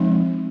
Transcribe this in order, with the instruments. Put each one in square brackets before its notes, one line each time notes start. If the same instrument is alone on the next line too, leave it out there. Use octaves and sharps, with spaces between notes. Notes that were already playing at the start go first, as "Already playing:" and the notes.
Already playing: [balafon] F3 G#3 C4 D#4